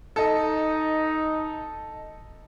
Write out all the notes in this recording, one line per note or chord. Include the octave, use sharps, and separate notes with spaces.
D#4 A4 D#5